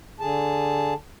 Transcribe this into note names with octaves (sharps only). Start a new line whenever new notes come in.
D3 G#4 A5